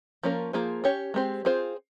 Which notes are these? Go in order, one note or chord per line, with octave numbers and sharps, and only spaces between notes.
F3 A#3 C#4 F4 A#4
F3 A#3 F4 G#4 C5
C#4 G4 C#5
G#3 C4 G4 C5
C4 F4 G#4 C5